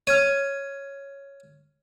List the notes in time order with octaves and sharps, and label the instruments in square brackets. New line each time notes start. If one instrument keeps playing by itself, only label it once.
[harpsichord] C#5 [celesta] F6 G#6 D#7